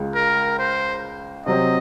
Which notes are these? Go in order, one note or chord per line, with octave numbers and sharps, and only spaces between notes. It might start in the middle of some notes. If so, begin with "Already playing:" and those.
Already playing: C#2 C#3 G#3
A#4
C5
C3 F#3 C4 D#5